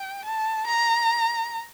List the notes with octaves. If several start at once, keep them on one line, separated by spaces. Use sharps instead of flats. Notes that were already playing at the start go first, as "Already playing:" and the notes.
Already playing: G5
A5
A#5